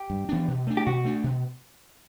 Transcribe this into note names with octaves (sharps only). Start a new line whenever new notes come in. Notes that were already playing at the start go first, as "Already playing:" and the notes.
Already playing: G4
G2
E3 B3 D4
B2
A3 D4
G4
B2 F#4
A3 D4
B2